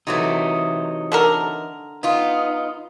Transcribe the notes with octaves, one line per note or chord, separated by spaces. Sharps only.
C3 E3 F#3 A3 D#4
D3 A4 A#4
B3 D#4 F4